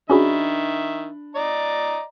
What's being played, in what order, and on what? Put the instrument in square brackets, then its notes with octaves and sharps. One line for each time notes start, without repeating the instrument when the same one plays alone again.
[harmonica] D#3 E5 [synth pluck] C#4 F#4 G#4 [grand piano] D4 B5
[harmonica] D5 D#5 A#5